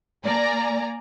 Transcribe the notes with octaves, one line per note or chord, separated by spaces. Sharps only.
A#3 D5 G#5 A#5